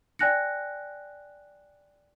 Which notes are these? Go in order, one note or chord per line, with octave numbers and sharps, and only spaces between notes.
D5 G5 G#5 F#6 A#6 C#7